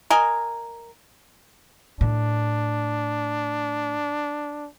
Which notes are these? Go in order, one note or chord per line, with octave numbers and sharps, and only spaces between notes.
A#4 D#5 G#5
A2 D4